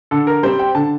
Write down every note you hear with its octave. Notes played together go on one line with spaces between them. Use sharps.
D3 A4
A#4
G3 C4 C5
G5
D3 A5